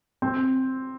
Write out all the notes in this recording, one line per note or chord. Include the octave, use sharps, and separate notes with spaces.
C4